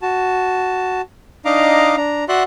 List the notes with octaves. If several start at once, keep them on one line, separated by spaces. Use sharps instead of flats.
F#4 A5
D4 D#4 D#5 F5 A#5 D6
D4 A#5
F#4 D5 E5 F#5 C6 F#6